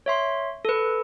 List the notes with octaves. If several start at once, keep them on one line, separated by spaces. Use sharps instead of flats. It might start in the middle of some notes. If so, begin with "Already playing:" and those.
C#5 E5 C6
A4 B4